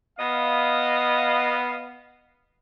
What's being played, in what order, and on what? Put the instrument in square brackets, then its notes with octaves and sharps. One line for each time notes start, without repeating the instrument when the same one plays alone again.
[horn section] B3 D#5 F5